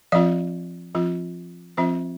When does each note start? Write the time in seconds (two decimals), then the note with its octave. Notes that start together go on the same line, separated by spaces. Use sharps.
0.12 F3 C4 F4 D5 F5
0.95 F3 C4 F4
1.77 F3 C4 F4 C5 E5